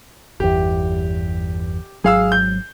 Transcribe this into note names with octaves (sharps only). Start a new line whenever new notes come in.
G1 E2 G4
G#1 F#3 G#4 F5 E6
G6